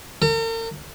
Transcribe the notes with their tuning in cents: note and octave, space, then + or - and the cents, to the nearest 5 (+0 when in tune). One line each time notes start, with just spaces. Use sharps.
A#4 -45